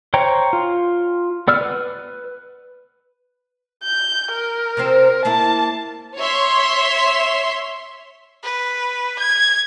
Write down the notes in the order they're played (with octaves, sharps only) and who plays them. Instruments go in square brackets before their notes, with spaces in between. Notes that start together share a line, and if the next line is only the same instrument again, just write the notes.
[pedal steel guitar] C5 C#5 G5 A#5
F4
B3 D5 E6 F6
B4
[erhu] G6
A#4
[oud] C3 F3 C4
[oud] A#3 E4 A#4 [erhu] A5
[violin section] C#5 E5 C6
[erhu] B4
G#6